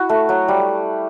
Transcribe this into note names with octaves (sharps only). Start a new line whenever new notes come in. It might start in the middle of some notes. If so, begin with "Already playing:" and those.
Already playing: E4 F#4
A3
F#3
G3